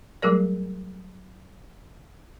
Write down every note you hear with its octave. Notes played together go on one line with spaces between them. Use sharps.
F#3 G3 A3 G#4 A#4 D5